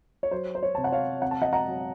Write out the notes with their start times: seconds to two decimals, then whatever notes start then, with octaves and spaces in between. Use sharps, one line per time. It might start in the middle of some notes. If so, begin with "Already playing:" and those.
0.23 C#5
0.31 F#3 C5
0.55 C5
0.63 C#5
0.75 C3 A5
0.84 F#5
0.92 C#5 F5
1.22 C4 F#5
1.31 A5
1.42 D#5 F#5
1.53 F#5 A#5
1.67 F#3